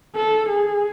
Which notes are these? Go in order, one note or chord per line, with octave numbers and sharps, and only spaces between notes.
A4
G#4